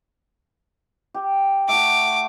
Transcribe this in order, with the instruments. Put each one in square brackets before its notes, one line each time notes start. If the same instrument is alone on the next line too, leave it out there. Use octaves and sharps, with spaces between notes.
[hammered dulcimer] G4
[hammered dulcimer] A3 F#4 [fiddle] D6